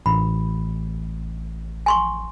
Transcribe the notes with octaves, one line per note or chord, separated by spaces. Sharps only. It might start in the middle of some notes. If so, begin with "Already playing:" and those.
A1 B5
G#5 C6 C#6